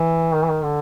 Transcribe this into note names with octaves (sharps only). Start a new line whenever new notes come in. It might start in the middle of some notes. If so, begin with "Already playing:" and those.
Already playing: E3
D#3
E3
D#3
D3